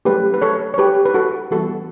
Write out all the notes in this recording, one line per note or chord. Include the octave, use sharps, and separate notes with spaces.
F#3 A3 C#4 G4 B4
B4
A4 C#5
C#5
G4 B4
B4
F#4 A4
E3 G3 B3 F#4 A4